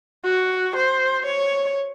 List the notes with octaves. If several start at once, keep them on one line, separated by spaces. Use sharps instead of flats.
F#4
C5
C#5